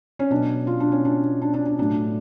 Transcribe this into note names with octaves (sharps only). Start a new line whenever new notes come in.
C#4
B2 F#3 D4
F4
D4
C#4
D4
D4
D4
D4
A2 F#3 D4